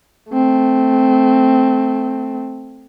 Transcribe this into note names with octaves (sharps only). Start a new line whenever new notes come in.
A3 C4